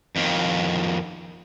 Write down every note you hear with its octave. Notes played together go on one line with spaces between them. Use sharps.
F2 D#3